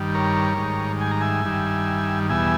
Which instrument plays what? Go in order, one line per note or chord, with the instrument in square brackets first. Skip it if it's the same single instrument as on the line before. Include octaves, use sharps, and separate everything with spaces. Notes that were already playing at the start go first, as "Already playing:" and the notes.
Already playing: [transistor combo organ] G2 D#3 G3
A#4 C#5
G#2 D#3 G3
G#5
A#5
E5 G#5
G2 D#3 G3
E2 B2 G3 E5 G#5